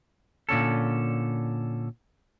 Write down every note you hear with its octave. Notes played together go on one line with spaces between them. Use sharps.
A#2 D3 C#4 A4